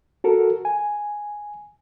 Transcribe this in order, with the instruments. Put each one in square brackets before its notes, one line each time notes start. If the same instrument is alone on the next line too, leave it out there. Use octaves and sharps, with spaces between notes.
[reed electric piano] F#4 A4 A#4
G#5